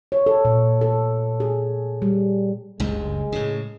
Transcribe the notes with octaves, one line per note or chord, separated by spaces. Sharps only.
C#5
A4
A#2
A4
G#4
G3
F#1 C#2 G2 G#3
A2 C#3